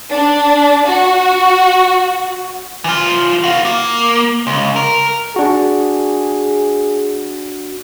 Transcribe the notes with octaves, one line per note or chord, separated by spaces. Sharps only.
D4
F#4
E3 F4
F#4 F5
A#3
C#2
A#4
D4 F#4 G#4